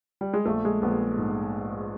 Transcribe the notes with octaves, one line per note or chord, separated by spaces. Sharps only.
G3
G#3
A#1 A3
G#3
A#1 B3
G#2